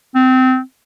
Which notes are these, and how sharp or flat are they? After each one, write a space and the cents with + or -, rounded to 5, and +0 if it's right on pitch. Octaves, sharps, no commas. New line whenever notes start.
C4 -20